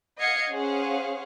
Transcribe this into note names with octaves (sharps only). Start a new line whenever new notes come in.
D#5 F5 F#5 G#6 C7 C#7
C#4 G#4 C5 F5 F#5